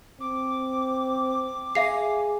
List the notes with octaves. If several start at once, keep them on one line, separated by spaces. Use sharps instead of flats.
C4 D6
G#4 E5 F5 C7